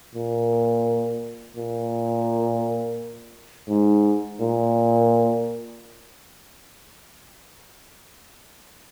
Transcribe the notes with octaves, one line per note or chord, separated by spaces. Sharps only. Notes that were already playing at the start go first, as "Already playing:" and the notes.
A#2
A#2
G#2
A#2